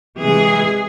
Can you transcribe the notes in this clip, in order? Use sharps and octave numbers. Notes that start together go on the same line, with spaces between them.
C3 E3 G#3 G#4